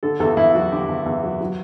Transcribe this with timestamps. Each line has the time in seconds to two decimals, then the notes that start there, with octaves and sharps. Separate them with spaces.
0.03 D3 A4
0.20 E2 A4
0.37 E2 E4
0.55 F#3 F#4
0.72 D3 G4
0.89 E2
1.06 E2
1.23 F#3
1.40 F#3